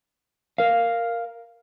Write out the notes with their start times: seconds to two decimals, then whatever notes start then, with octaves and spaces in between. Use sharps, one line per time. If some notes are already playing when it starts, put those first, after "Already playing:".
0.58 A#4 F5